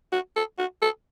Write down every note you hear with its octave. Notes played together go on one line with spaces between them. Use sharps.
F#4
A4
F#4
A4